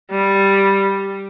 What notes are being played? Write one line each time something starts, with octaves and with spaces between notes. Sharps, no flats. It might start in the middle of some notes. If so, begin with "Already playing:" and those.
G3